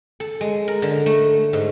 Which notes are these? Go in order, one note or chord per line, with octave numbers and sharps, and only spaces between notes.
A4
G#3
A#4
D3
A3
G#2